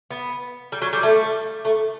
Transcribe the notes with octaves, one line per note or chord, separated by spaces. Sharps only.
B3
G3
F#3
G3
A3
A3